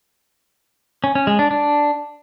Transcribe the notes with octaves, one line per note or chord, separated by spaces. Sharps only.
C#4
C#4
G#3
D4
D4